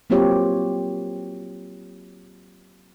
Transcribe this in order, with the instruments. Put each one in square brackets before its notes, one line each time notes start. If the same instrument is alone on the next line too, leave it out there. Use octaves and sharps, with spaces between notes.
[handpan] F#3 A#3 C4 F4 G4 C#5